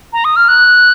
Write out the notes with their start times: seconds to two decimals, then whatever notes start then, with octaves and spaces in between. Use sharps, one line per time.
0.13 A#5
0.25 D#6
0.36 F6
0.48 F#6